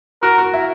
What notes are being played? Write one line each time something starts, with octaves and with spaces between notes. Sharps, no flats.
F#4 A#4
F#4
E4